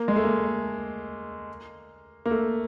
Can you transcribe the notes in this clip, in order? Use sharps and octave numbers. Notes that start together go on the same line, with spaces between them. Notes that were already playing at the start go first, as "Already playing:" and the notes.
Already playing: A#3
G#3
A3
A#3
A#3
A3